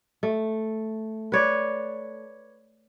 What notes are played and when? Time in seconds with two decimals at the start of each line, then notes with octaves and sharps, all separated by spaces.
0.23 A3
1.32 B4 C#5 D5